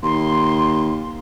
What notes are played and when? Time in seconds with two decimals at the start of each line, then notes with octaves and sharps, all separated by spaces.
0.03 D#2 C6